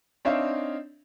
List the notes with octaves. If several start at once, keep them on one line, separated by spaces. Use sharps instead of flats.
C4 D4 D#4 C#5 E5 F5